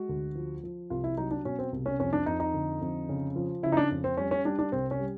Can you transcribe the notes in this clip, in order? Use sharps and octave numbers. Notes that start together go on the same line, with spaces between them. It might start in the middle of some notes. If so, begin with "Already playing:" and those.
Already playing: G#3 F#4
D2
F3
F3
C2 F4
E4
F#3 D#4
D4
B2 C#4
C4
C2
C#4
F2 C#4
D4
F2 D#4
D#4
D3
F2
C#3
F3
C#3 E4
D#4
D4
F2
C4
G3 C#4
C#4
G3 D4
D4
C2 C4
C#4
G3